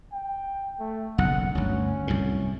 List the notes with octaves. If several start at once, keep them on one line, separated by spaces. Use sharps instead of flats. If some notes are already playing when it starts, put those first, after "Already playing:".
G5
A3
F#1 B1 E2 F#5
G1 D2 C#4
C2 F#2 A2